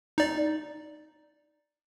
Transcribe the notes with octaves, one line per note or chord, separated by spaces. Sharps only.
D#4 D5